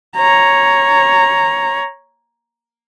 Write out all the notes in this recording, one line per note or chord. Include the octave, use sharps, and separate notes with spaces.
C#5 A#5